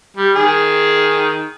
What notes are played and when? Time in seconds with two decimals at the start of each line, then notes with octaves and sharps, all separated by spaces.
0.17 G3
0.36 D#3 G#4